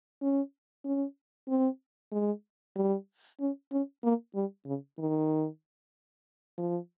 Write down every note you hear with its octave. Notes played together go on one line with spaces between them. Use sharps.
C#4
C#4
C4
G#3
G3
C#4
C#4
A#3
G3
C#3
D#3
F3